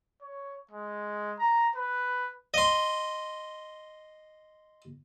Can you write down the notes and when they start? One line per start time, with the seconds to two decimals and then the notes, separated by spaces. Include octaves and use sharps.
0.22 C#5
0.71 G#3
1.39 A#5
1.75 B4
2.54 D#5 C6